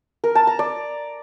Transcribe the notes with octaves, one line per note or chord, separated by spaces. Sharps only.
A#4
A5
A#5
D5